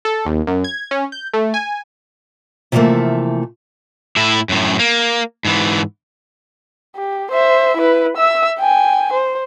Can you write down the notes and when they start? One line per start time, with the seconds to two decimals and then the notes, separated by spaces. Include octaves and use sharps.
0.05 A4
0.25 D#2
0.47 F#2
0.64 G#6
0.91 C#4
1.12 G6
1.34 A3
1.54 G#5
2.72 C3 E3 F3 G3 A3 A#3
4.16 A2 E4
4.49 F#2 A2
4.79 A#3
5.45 G#2 E3
6.96 G4
7.31 C5 E5
7.77 E4 B4
8.17 E5 E6
8.59 G5 G#5
9.13 C5